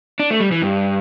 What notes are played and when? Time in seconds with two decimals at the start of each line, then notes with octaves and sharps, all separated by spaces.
0.20 D4
0.31 A3
0.40 G3
0.52 E3
0.62 G2